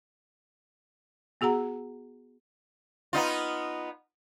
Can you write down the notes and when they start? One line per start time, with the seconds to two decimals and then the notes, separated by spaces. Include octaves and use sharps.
1.41 B3 F#4 G#4 F#5 A#5
3.13 B3 D#4 F4